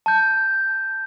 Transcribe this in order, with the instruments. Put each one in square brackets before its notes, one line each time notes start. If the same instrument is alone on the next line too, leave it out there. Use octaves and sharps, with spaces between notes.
[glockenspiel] A5 G6